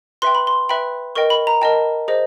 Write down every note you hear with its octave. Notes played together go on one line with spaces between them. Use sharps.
B4 E5 G5 C6
B5
C6
B4 E5 G5 B5
A#4 D#5 G5 C#6
B5
A#5
A#4 D#5 G5 A5
G#4 C5 D#5